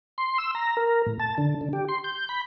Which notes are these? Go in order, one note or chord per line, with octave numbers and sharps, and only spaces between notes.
C6
E6
A#5
A#4
A2
A5
D3
D3
G4
C6
G6
B5